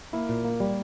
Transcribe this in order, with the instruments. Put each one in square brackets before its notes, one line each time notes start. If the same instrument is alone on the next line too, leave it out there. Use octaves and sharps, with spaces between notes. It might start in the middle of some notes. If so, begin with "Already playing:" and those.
[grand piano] A#3 [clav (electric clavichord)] E4
[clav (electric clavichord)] A#2
A#3
G3